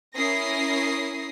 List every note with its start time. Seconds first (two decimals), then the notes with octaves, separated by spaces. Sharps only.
0.16 C#4 E4 A#4 D#6 A#6 C7